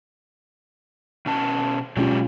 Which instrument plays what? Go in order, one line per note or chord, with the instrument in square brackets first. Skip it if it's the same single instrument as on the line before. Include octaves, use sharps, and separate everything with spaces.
[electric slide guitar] B2 C#4 A5
[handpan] B2 C#4 F4 [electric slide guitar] F#3 G#3 G4